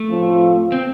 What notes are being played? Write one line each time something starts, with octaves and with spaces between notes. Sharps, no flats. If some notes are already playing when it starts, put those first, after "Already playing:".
Already playing: A3
A2 F3 C4 F4
C4